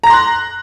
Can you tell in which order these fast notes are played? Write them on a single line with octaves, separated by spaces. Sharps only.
A#5 A#6 C6 F#6